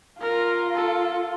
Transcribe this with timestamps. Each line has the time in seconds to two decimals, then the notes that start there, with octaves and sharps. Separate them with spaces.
0.21 F4 A#4
0.75 A4